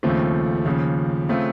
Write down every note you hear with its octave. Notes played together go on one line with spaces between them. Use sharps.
D#2 C#3 F3 A3 C4
D#2 C#3 F3
C#3 A3 C4 F4